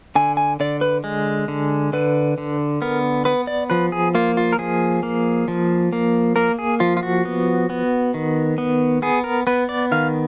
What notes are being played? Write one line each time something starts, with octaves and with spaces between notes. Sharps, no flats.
D3 G#5
G#5
D3 D5
B4
G#3
D3
D3 B4
D3
B3 A#4
B3 B4
D5
F3 B4
G#4
A#3 F4
F4
A#4
F3 G#4
A#3
F3
A#3
A#3 A#4
G#4
F3 F4
F4
F#4
B3
B3
D#3
B3
B3 G#4
A#4
B3 B4
D5
D#3 F5